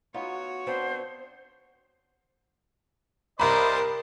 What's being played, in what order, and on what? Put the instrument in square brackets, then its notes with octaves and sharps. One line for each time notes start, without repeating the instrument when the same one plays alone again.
[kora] B3 D#4 F4 [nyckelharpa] F#4 C#5
[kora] B3 C4 D4 [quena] C5
[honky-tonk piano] C2 B5 [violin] A#4 [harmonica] C5 D5 D#5 [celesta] A#5